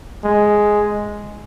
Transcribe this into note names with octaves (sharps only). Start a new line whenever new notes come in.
G#3